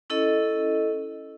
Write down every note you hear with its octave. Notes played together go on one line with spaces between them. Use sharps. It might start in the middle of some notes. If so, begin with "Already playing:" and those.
C#4 E4 A4 D#5